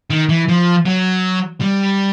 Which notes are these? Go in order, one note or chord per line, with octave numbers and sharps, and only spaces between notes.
D#3
E3
F3
F#3
G3